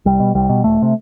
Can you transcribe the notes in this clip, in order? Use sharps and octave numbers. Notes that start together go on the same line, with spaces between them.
C2 G3
B2
C2 G3
B2
E1 A3
C3